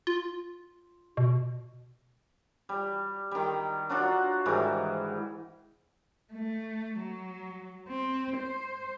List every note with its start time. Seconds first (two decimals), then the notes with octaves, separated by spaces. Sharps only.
0.07 F4
1.17 B2
2.69 G3
3.31 D#3 G3
3.89 F#3 D4 F4 F#4
4.46 G#2 D#3 E3 G3
6.33 A3
6.99 F#3
7.89 C4
8.37 C5